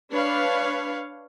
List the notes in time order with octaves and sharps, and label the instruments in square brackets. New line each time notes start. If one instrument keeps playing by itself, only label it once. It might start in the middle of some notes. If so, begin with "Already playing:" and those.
[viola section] D4 B4 C#5 F5